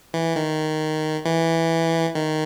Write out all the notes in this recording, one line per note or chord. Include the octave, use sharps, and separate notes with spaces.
E3
D#3
E3
D#3